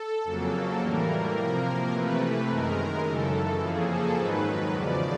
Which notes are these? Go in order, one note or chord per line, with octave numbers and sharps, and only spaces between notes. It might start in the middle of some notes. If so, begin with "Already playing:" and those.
Already playing: A4
F2 C#3 F#3 A#3 A4
A2 E3 G3 A#3 A#4
C3 F3 A#3
C3 E3 A3 B4
F#2 D#3 G#3 A#4
F#2 C#3 E3 A4
F2 C#3 F3 A#3 G#4
A4
G#2 D#3 F#3 B4
E2 C#3 F3 D5